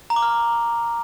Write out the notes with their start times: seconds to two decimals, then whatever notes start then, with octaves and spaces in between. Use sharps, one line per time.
0.10 A#5
0.16 D6
0.22 F6